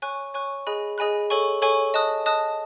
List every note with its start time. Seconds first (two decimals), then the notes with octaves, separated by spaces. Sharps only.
0.02 C#5 G#5 C#6 F#6
0.34 C#5 G#5 C#6 F#6
0.67 G#4 D#5 G#5 B5 F#6
0.98 G#4 D#5 G#5 B5 F#6
1.30 A4 C#5 G#5 C#6
1.62 A4 C#5 G#5 C#6
1.94 D#5 A5 D#6 F#6
2.26 D#5 A5 D#6 F#6